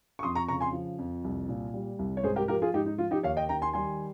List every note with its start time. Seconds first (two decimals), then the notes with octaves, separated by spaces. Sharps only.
0.19 C#6
0.23 F2 C6 D#6
0.35 A#5 C#6
0.48 C#3 A#5 C#6
0.61 G#5 C6
0.73 F3
0.98 F2
1.24 C2
1.49 A#2
1.74 G3
1.99 C2
2.17 C#5
2.23 G#2 G#4 C5
2.36 G4 A#4
2.48 F3 G4 A#4
2.62 F4 G#4
2.74 G#2 D#4 G4
2.86 D#4
2.98 F3 F4
3.11 D#4 G4
3.23 D#2 C#5 F5
3.37 D#5 G5
3.49 D#3 G5 A#5
3.62 G#5 C6
3.73 G3 G#5 C6